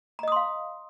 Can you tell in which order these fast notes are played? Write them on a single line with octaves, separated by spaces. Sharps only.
A#5 D#5 D#6 C6 F5